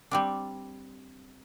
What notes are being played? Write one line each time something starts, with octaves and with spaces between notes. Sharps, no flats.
G3 C4 D4